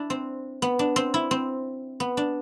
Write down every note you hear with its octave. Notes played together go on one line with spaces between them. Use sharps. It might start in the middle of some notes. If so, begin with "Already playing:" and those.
Already playing: D4 E4
C4
B3
D4
C4
E4
C4
B3
D4